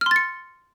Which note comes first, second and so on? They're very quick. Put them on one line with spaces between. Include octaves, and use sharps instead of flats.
F6 C6 A6 C#7